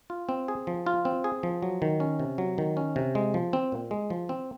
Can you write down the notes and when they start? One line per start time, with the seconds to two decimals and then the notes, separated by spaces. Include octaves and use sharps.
0.10 F4
0.29 C4
0.48 G#4
0.67 F3
0.86 F4
1.05 C4
1.24 G#4
1.43 F3
1.62 F#3
1.82 D#3
2.00 C#4
2.19 C3
2.38 F#3
2.58 D#3
2.77 C#4
2.96 C3
3.15 G#3
3.34 F3
3.53 C4
3.72 A#2
3.91 G#3
4.10 F3
4.29 C4